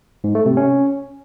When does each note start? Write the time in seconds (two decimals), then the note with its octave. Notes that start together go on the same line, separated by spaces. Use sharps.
0.24 G#2
0.35 A3
0.46 C3
0.57 C#4